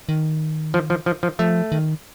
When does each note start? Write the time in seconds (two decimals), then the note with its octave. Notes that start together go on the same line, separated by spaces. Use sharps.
0.09 D#3
0.74 F3
0.90 F3
1.06 F3
1.23 F3
1.39 F3 A3
1.72 D#3